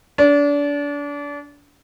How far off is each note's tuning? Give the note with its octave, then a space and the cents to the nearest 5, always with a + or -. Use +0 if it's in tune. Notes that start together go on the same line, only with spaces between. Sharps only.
D4 -30